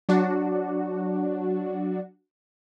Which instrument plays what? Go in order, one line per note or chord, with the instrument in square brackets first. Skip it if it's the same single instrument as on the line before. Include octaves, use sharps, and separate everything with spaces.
[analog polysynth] F#3 D4 F#4